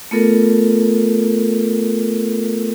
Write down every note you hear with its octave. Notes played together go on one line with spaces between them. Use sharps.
A3 B3 F4 A4 A#4